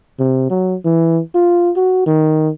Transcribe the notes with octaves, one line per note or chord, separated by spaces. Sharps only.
C3
F#3
E3
F4
F#4
D#3